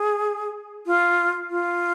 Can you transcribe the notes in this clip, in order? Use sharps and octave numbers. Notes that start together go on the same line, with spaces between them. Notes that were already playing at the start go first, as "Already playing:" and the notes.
Already playing: G#4
F4
F4